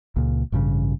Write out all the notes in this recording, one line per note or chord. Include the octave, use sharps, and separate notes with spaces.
C#2 A#2
A1 G2 A#2 C#3